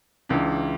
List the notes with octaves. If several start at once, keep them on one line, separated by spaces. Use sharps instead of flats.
C#2 C#3 E3 D4